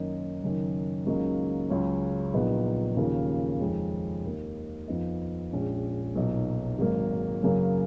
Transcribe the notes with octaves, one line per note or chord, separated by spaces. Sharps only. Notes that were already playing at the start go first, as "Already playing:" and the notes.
Already playing: F#2 D#3 A#3 D#4
F#1 F#2 D#3
C#2 C#3 F#3 A#3 D#4
C#2 C#3 F#3 C#4
A#1 A#2 F#3 B3 D#4
D#2 C#3 F3 A#3
F2 D#3 G#3 C#4
D#2 D#3 A#3 D#4
F2 F3 B3 D#4
A#1 A#2 G#3 C#4
B1 A#2 F#3 B3 D#4
G#1 G#2 F#3 A#3
F#2 C#3 F#3 A#3